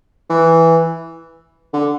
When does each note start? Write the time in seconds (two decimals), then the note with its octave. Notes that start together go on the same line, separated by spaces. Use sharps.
0.29 E3
1.73 D3